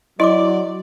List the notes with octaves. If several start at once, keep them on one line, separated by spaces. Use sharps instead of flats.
F#3 E4 D5 D#5 C6 D6